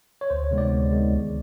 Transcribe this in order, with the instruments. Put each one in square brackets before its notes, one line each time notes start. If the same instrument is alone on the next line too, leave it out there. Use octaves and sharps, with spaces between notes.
[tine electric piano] C#5
D2 C5
C#5
C3 D#3 G#3 B3
D5
D2
C3 D#3 G#3 B3
C#2